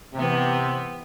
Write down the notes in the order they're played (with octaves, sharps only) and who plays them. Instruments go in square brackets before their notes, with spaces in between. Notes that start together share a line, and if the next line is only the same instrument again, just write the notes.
[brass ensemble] C3 [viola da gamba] E3 B3